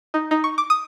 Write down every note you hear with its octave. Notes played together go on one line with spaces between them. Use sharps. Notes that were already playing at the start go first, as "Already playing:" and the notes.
D#4
D#4
C#6
D6
D#6